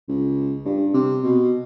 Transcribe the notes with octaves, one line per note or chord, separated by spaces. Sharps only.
C#2
G2
C3
B2